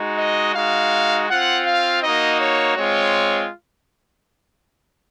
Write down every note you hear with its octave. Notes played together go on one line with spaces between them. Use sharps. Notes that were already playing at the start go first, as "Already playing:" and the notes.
Already playing: G#3 D#4 F#4
D#5
G#3 D#4 F#4 F5
C4 F4 F#5
F5
A#3 D#4 F#4 D#5
C#5
G#3 C4 F4 C#5